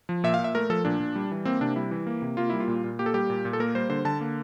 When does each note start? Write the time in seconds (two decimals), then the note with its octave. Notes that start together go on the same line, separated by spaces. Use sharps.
0.09 F3
0.24 A#2 E5
0.34 F5
0.39 A#2
0.44 E5
0.55 A3 A#4
0.70 F3 A4
0.85 A#2 D4
1.00 A#2
1.16 G3
1.31 E3
1.45 A#3 C4
1.61 C3 D4
1.76 G3 E4
1.91 E3
2.07 A#3
2.22 C3
2.37 A#3 F4
2.50 G3 E4
2.60 F4
2.68 A#2
2.84 A#2
2.99 A#3 G4
3.06 A4
3.14 G3 G4
3.30 A#2
3.45 A#2
3.53 A4
3.60 A#3 A#4
3.75 G3 C5
3.89 D3 C5
4.05 D3 A5
4.21 A#3